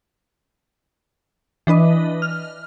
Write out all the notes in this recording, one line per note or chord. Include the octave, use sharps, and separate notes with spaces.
E3 D4 B4 D#5
F6